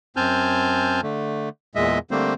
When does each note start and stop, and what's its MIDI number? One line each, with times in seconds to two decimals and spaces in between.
0.16 1.01 42
0.16 1.01 60
0.16 1.01 80
0.16 1.01 81
0.16 1.01 89
0.16 1.01 91
1.03 1.49 50
1.03 1.49 57
1.75 1.99 40
1.75 1.99 46
1.75 1.99 56
1.75 1.99 75
1.75 1.99 76
2.11 2.34 50
2.11 2.34 55
2.11 2.34 57
2.11 2.34 58
2.11 2.34 60
2.11 2.34 72